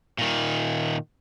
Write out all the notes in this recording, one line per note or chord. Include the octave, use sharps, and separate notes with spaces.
A#2 D#3